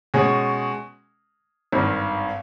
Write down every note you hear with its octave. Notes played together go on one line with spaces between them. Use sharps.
B2 G#3 C#4 G#4
G#1 G2 D#3